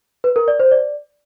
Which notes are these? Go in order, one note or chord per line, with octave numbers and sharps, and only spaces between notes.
B4
A#4
D5
C5
D5